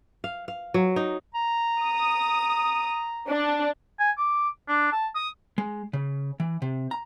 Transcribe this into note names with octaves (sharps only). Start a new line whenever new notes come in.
F5
F5
F#3
D#4
A#5
D#6
D4
G#5
D6
D4
A5
D#6
G#3
C#3
E3
C3
A#5